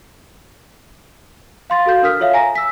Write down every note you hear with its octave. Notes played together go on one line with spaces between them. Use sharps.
F5 C6 A6
F#4 A4 F5 G6
D4 A#4 D#6 F6 B6
F4 A4 C#5 E5 F5
G#5 A#5 A#6
E6 B6